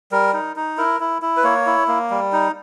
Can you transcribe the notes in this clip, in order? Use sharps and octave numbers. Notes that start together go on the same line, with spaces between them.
G3 A#4
D#4
D#4
E4 A#4
E4
E4
B4
A#3 C#5
E4
A#3
G3
D#4